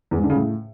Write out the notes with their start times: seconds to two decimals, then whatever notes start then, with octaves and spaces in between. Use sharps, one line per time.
0.11 E2
0.17 G#2
0.24 D3
0.30 C#3
0.36 A2